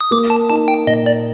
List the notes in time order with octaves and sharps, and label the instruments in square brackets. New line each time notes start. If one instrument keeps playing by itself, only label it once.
[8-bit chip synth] D#6
[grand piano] A#3 [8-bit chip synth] D6
[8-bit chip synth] A5
[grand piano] D#4 [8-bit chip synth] A5
[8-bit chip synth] G5
[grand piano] A#2 [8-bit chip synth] D#5
[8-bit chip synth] D5